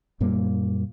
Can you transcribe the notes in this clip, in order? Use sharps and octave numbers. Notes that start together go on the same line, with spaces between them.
F#2 A#2 G3 A#3